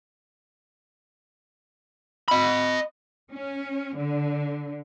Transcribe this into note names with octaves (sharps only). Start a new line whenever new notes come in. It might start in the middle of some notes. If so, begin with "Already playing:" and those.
D#5 B5
C#4
D3